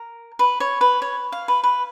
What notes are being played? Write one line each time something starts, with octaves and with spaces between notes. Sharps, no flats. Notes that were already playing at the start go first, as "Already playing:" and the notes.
Already playing: A#4
B4
C#5
B4
C#5
F5
B4
B4